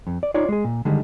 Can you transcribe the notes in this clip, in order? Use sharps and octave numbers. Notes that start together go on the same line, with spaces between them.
F2
D5
D#4 F4 C#5 D5
G#3 G#4
A#2
D3 D#3 G3 G#3